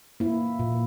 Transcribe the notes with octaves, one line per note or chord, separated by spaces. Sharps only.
A#3 E4
A#2